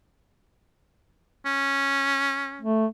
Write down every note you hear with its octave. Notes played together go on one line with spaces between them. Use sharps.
C#4
A3